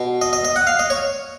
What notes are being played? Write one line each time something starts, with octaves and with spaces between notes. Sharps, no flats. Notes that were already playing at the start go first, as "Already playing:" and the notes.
Already playing: B2
D#5
D#5
D#5
F#5
F5
D#5
C#5